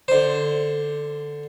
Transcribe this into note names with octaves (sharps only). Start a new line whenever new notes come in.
D3 C5